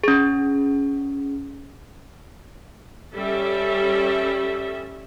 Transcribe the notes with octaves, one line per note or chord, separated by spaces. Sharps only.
C#4 G#4
G3 C#4 A4 E5